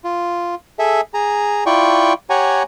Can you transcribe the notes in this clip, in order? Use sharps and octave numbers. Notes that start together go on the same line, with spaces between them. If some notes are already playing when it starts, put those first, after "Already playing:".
F4
G#4 A4 E5
G#4 A#5
E4 F4 D5 G5 C#6
G4 C#5 F#5 G#5 A#5